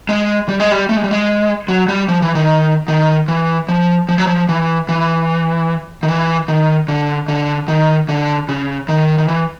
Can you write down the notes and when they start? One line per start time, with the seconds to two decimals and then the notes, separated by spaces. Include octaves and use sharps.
0.09 G#3
0.49 G3
0.60 G#3
0.72 G3
0.89 A3
0.97 G#3
1.04 G3
1.11 G#3
1.68 F#3
1.88 G3
2.09 F3
2.22 E3
2.35 D#3
2.88 D#3
3.28 E3
3.69 F3
4.09 F3
4.18 F#3
4.27 F3
4.49 E3
4.89 E3
6.03 D#3
6.08 E3
6.48 D#3
6.88 D3
7.28 D3
7.68 D#3
8.09 D3
8.49 C#3
8.89 D#3
9.18 D#3
9.28 E3